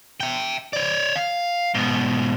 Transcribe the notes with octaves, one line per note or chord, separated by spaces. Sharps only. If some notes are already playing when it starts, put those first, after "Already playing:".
E5 G5
C#5 D5
F5
G#2 B2